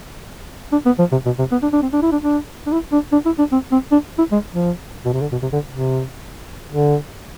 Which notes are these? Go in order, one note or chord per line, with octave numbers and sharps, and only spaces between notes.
D4
B3
F3
C3
B2
C3
B3
D4
D4
C4
D4
E4
D4
D4
D4
E4
D4
D4
E4
D4
C4
C4
D4
E4
G#3
F3
B2
C3
D3
B2
C3
D3
C3
D3